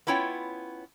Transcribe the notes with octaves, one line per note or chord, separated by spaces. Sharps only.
B3 C#4 E4 F4 C#5 G5